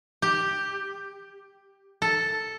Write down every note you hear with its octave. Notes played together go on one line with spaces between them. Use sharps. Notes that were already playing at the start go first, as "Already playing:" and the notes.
G4
A4